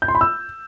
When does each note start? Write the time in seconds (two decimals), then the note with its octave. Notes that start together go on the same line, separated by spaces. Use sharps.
0.02 G6
0.08 C6
0.15 B5
0.21 E6